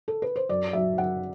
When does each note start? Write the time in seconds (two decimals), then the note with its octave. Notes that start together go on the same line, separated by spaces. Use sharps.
0.08 A4
0.22 B4
0.36 C5
0.49 F#2 D5
0.73 F#3 E5
0.98 F#2 F#5